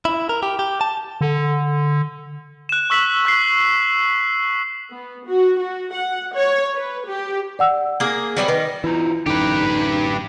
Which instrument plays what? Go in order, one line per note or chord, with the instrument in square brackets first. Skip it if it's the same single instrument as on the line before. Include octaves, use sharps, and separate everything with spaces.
[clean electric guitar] E4
A#4
G4
G4
A5
[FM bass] D3
[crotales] F#6 E7
C#6 E6 B6 E7 F#7
C#6 F#6 C7
[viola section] B3
F#4
F#4
F#5
C#5
B4
G4
[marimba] D5 F#5 E6
[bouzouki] A#3 G#4
F#3 G3 B3
[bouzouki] D#3 [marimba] B4
[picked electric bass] E3 [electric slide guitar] E4 F4 A#5
[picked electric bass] A1 F#2 D3 [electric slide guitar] D#4 [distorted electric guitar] G4 B4